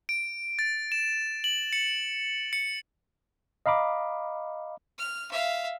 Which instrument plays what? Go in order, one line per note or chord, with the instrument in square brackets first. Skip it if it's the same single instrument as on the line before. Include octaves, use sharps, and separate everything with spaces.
[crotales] D7
A6
E7
F#7
C#7
C#7
[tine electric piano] D#5 F5 A#5 B5 D6
[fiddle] F6
E5 F5